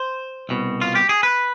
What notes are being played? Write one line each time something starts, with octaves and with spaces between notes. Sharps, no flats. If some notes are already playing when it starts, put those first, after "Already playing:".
Already playing: C5
C2 B2
F4
G4
G#4
B4